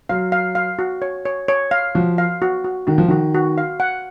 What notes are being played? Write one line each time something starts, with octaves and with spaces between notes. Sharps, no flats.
F#3 F5
F5
F5
F#4
C#5
C#5
C#5
F5
F3 F#4
F5
F#4
F#4
D#3 F#4
F3
D#3 F#4
F#4
F5
F#5